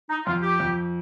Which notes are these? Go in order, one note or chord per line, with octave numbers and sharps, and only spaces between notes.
D#4
F2 F4
G4
F2